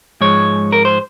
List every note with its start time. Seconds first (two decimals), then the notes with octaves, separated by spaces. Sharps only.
0.21 G#2 F3 G#3 C#5
0.72 A#4
0.85 C5